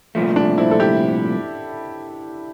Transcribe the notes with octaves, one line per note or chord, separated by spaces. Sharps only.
C2 A#2 F3 A3
D4
C4 E4
A4
E4 G4